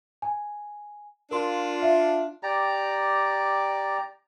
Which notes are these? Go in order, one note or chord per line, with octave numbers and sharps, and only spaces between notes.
G#5
D4 F4 A#4 C6
E5
G4 D5 A#5